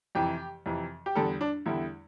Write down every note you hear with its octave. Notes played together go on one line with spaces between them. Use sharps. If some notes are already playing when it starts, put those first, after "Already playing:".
F2 C3 E3 G4
F2 C3 E3
G4
E2 D3 G3 A4
D4
E2 D3 G3 E4